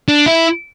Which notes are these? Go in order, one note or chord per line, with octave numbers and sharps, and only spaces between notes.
D4
E4